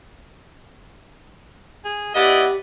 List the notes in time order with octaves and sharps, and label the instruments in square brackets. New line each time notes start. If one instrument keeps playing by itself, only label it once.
[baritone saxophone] G#4
[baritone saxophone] B3 [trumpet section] E4 D5 D#5 [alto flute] G4